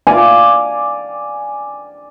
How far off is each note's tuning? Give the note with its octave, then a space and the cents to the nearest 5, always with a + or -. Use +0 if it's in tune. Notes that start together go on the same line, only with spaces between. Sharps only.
D5 +0 F5 +0 G#5 +0